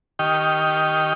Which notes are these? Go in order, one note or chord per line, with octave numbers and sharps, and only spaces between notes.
D#3 G4 D#5 G5 C#6 F6